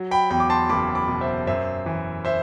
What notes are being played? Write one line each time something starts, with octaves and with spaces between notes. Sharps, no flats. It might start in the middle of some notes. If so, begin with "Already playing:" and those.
Already playing: F#3
G5 B5
E2 G5 B5
D6
A5 C6
F#1 B5 D6
B5 D6
B2
C5 E5
F#2 C5 E5
E3
C5 E5